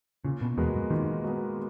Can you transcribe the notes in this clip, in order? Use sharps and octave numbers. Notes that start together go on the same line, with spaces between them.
A#2 C#3
B2
E2 G#3 B3 F#4 A#4
F#2
A#2 D#3
G#3 B3 F#4 A#4